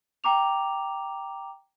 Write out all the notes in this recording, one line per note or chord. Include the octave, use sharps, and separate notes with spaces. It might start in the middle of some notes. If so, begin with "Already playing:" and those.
G5 A#5 D6 F7